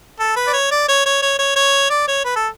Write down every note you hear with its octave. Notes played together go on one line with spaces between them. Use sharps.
A4
B4
D5
C#5
D5
C#5
C#5
C#5
C#5
C#5
D5
C#5
B4
A4